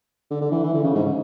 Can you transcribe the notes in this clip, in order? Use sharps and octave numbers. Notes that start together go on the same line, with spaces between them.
D3
D3
E3
E3
D3
C#3
G#2